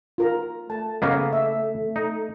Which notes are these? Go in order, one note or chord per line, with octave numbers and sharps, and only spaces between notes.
F4 A#4 A#5
A3 A5
C#3 A#3 B3 D#5
E5
D#4